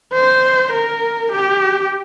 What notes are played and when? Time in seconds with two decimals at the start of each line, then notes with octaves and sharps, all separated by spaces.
0.14 C5
0.73 A#4
1.32 G4